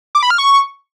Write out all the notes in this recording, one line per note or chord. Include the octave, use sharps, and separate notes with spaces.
D6
B5
F6
C#6